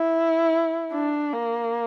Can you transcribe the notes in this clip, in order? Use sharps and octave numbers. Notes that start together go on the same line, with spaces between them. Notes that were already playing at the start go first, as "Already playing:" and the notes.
Already playing: E4
D4
A#3